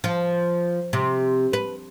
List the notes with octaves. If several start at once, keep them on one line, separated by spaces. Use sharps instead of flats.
F3
C3
B4